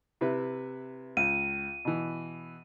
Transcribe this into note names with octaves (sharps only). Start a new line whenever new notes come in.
C3 E4 B4
C#2 D#7
B2 E3